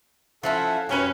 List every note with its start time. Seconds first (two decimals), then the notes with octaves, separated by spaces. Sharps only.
0.43 F3 C#4 E4 A4 E5 F#5
0.89 F#2 C#4 G4 A#4 B4 C#5 G#5